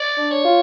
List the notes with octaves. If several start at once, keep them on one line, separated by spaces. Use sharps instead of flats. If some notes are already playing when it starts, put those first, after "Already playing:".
Already playing: D5
D4
C#5
F4